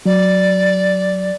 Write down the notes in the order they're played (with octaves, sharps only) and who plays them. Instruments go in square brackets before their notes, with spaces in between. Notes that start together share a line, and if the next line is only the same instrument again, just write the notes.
[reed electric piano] F#3 [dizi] D5